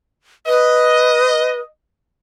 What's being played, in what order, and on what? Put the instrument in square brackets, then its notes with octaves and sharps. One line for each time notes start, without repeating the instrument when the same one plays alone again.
[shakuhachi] B4 [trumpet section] D#5